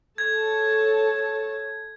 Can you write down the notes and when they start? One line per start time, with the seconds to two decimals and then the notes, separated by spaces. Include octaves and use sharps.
0.18 A4 C#5 A5 G#6